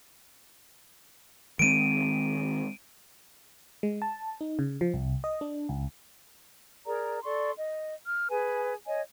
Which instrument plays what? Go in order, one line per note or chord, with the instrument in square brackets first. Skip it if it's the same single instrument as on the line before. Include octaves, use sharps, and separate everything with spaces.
[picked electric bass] D#3 G#3 C4 [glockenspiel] D7 D#7
[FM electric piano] G#3
A5
D#4
C#3
F3
C2
D#5
D4
C#2
[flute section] G#4 A#4 D5 A#5
A4 D5 C6 C#6
D#5
F6
G#4 B4 G#5
C#5 D#5 G#5